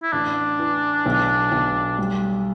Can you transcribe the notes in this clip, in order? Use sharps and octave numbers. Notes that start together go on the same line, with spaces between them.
E4
A1 D4
E3
B1
B1
G3